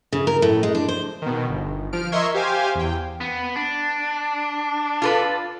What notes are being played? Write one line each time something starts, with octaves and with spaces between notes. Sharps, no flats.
C#3
A#4
A2
G#3
D4
C5
B2 D#3
G1
F3 F6 D7
A#4 D#5 E5 C6 C#6 G#6
G4 C5 F5 G#5
E2 G5
B3
D4
F4 A4 B4